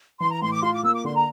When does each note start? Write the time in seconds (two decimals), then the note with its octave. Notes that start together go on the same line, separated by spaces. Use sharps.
0.20 E3 C6
0.31 A#5
0.42 A2 C6
0.52 D6
0.62 F4 C6
0.73 D6
0.83 A#3 E6
0.94 D6
1.04 D3 C6
1.16 A#5